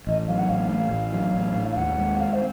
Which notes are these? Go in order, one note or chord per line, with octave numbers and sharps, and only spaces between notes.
A1 D#5
F#3 F5
F#5
A1 F5
A2
A1
F#3
A1
A2
F5
D#2 F#5
G#3
C4 F5
C5